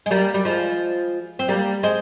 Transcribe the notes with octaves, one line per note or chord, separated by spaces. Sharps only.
G#3
G3 A#3
G3
F3 G#3
C4
G3 A#3
G#3 C4